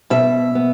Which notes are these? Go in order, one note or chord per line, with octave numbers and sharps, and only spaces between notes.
B2 E5
B3